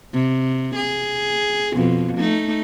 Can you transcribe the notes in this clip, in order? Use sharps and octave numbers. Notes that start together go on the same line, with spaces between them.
C3
G#4
F2 B2
A3 D#4